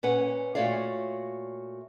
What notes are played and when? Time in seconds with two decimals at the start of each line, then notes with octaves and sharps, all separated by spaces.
0.03 A#2 C#4 B4 F#5
0.55 A#2 A3 F#4 C#5 D5 F5